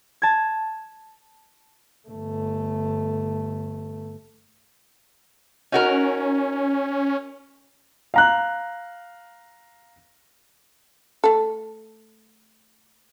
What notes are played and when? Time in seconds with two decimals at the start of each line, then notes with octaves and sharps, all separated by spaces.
0.22 A5 G#6
2.08 G1 A3
5.72 C#4 D#4 F#4 A#4
8.14 F5 A#5 F#6
11.24 A3 A4